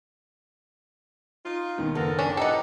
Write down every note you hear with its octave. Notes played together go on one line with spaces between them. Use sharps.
D#4 F4
D#2 B2 D#3
F#1 D3 B3 A4 A#4
C#4 D4
E3 D#4 G4 A4 D#5 F#5 G5